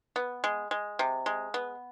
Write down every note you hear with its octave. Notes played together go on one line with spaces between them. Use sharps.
B3
G#3
G#3
C3
G#3
B3